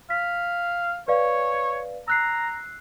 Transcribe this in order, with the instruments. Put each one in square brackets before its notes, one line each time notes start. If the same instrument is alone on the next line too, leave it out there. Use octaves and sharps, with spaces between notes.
[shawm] F5 [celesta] B6
[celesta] B4 D5 F5 [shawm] C#5
[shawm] A#5 [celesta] E6 F#6 C7